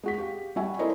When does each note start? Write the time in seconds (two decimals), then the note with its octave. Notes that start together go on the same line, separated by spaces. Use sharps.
0.03 G#3 F#4 B6
0.18 G4 F5
0.56 G3 F#4 E5 G#5
0.79 E4 A4 A#4 C5 D5 D#5